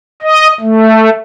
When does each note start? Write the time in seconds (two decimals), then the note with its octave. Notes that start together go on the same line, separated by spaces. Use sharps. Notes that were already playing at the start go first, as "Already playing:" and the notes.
0.22 D#5
0.61 A3